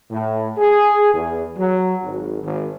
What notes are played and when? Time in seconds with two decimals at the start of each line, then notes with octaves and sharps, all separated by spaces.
0.10 A2
0.57 G#4
1.13 E2
1.57 F#3
2.03 G#1
2.42 G#1